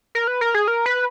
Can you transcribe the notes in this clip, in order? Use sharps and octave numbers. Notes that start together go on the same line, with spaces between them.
A#4
B4
A#4
G#4
A#4
B4